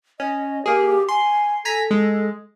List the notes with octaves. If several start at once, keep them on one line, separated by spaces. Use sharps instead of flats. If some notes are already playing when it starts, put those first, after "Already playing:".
C#4 D#5
A#3 G4 G#4
G#5 C6
A4 G#5 A#5 B6
G#3